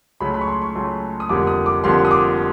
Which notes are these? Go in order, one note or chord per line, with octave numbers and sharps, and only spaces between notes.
C#2 C#3 F#3 A3 B5
B5
C#6
C6
C#6
C#2 C#3 F#3 A3
D#6
F1 F2 D3 G3 A#3 D6
D#6
D6
F1 F2 D3 G3 A#3 C6
D#6
D6